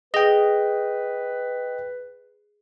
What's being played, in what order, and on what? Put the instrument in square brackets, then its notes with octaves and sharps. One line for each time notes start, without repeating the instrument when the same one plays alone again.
[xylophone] G#4 A#6 G7 [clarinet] B4 [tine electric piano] D#5 G5